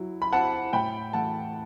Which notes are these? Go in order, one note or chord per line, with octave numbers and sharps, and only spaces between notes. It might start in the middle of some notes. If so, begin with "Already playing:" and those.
Already playing: F#3 E4
B5
C4 E4 F#5 A5
A2 G5 B5
E3 A3 E4 F#5 A5